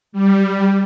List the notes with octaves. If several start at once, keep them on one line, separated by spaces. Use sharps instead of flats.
G3